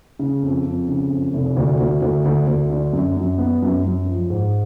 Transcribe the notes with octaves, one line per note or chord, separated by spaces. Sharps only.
C#3
F2
F2
C#3
F2
F1
D2
D2
D2
D2
D2
D3
F#2
F#2
B3
F#2
F#2
F3
G#2